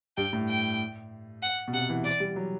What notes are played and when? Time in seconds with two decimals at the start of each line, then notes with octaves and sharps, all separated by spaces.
0.17 G2 G5
0.33 A2
0.48 G5
1.42 F#5
1.68 B2
1.73 C3 F#5
1.90 E3
2.04 E3 D5
2.20 G3
2.36 F#3